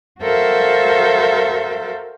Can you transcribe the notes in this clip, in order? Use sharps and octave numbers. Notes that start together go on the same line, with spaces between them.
F#4 A4 A#4 C5 E5 F5